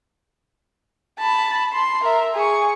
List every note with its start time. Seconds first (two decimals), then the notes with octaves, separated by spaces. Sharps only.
1.19 A5 B5
1.73 C6
2.04 A#4 E5
2.35 G#4 C#6